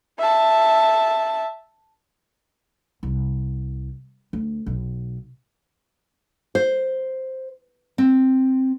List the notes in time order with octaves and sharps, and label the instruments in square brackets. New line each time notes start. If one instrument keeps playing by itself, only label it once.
[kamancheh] E5 A5
[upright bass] C2
D2
B1
[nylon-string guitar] C5
C4